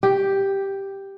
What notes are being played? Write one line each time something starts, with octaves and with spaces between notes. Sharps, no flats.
G4